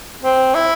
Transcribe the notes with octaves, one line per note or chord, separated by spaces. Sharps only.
C4
E4